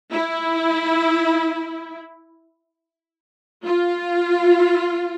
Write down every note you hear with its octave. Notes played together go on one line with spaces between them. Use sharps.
E4
F4